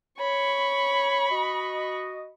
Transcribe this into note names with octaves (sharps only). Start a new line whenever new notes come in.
C#5 B5 C#6
F#4 D#5